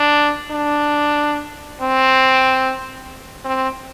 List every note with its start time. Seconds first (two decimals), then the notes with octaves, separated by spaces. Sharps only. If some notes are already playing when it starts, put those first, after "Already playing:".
Already playing: D4
0.51 D4
1.82 C4
3.45 C4